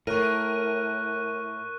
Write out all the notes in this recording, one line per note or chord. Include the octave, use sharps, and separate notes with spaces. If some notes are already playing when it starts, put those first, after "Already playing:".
A2 A#4 C#6 F#6 D#7